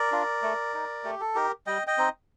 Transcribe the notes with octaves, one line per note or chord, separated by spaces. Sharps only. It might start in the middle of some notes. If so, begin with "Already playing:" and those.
Already playing: A#4 D5
D4 F4
A3
D#4
A3 G4
A4
D#4 G4 A#4
G3 D#5 G5
D#5 G5
C4 D#4